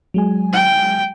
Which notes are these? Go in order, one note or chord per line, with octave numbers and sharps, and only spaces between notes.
F#3 G#3 G#5
G5